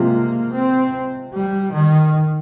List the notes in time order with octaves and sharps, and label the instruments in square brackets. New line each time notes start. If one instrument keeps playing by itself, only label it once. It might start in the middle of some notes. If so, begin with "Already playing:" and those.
Already playing: [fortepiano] C3 F3 G#3 [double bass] A#3
[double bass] C4
G3
D#3